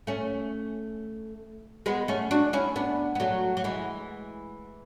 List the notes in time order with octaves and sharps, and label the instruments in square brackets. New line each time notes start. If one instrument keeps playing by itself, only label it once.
[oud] A3 C#4
G#3 B3
A3 C#4
D4 F#4
C#4 E4
B3 D4
B3
F#3 A3
F#3
E3 G#3